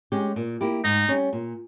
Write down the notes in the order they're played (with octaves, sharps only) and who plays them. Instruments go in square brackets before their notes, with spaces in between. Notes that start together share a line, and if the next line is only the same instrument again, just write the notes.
[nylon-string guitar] G#3 C#4 G4
A#2
A#3 E4 G4
[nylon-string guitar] G#2 [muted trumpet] D#4
[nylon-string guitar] G3 C#4
A#2